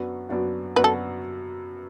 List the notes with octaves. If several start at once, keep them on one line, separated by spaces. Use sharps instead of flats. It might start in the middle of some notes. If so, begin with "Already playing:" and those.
Already playing: F#2 F#3 B3 D4 F#4
F#2 F#3 B3 D4 F#4
F#2 F#3 B3 D4 F#4 B4
A4